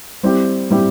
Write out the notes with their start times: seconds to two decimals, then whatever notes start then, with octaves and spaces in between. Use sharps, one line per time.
0.23 G3 C4 E4 G4
0.70 G3 C4 E4 G4